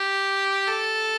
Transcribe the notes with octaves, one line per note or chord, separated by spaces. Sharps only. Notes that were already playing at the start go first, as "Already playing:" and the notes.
Already playing: G4
A4